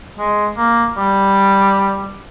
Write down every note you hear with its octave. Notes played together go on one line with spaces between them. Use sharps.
G#3
A#3
G3